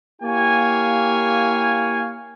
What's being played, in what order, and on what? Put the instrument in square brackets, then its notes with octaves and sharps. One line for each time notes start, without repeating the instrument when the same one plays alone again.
[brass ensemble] A#3 E4 G4 C#5 F5 G#5